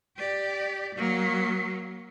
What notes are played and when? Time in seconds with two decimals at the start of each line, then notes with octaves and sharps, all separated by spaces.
0.18 G4 D5
0.95 F#3 A#3